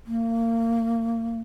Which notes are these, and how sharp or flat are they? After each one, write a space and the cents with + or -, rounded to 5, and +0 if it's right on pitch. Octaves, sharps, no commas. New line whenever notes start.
A#3 -30